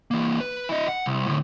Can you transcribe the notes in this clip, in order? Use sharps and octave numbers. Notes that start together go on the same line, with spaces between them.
E3 A#3
B4
E4 D#5
F#5
C2
A2 D3